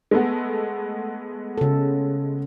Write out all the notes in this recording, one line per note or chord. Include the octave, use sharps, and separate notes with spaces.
G#3 A3 B3
C#3 A4